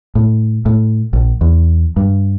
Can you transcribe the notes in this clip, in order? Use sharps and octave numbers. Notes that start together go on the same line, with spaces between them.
A2
A2
A#1
E2
G2